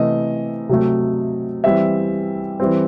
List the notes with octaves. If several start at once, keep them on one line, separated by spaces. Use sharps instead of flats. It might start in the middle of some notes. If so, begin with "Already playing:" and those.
Already playing: C3 E3 A3 D#5
C3 F#3 A3
E3 G3 C4 E5
E3 G3 C4